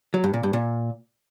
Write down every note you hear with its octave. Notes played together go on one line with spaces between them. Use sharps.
F#3
G2
A#2
G2
A#2